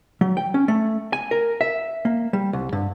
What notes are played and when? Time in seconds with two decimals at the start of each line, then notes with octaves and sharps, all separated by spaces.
0.21 F#3
0.37 G5
0.54 C#4
0.68 A3
1.13 G#5
1.31 A#4
1.61 E5
2.05 A#3
2.33 G3
2.53 C2
2.73 G2